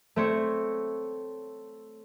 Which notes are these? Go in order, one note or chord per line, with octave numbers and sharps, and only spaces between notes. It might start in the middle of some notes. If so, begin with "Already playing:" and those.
A3 C4 C#5